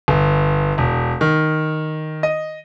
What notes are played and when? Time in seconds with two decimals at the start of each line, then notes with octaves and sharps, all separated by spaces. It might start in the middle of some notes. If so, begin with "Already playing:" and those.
0.08 G1
0.78 E1
1.21 D#3
2.23 D#5